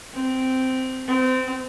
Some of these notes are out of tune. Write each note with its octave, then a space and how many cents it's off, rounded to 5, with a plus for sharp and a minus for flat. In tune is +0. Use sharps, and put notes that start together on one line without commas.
C4 -10
C4 -25